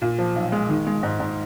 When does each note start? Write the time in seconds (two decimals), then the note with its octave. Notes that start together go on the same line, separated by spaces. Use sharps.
0.02 A#2
0.19 F3
0.35 B1
0.52 G#3
0.69 D#3
0.87 G#3
1.03 G#2
1.20 G#2